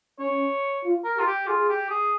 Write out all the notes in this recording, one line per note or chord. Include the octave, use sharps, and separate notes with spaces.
C#4 C#5
F4
A#4
F4 G4
G4
F4 G#4
G4
G#4